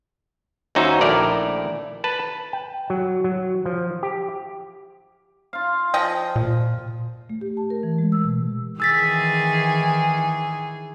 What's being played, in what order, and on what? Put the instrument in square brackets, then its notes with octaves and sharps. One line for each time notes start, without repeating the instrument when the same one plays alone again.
[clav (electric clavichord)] D#2 C#4 D#4 F#4 C5 E5
A#1 A3 E4 A#4 D5
B4 A5
G5
F#3
F#3
F3
G4
[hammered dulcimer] F4 F5
[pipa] F3 D#5 G5
[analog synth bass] A#2
[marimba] A3
G4
A5
A#4
E3
G#3
E6
B2
[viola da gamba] D#3 E3 G#4 [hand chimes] E6 A6 B6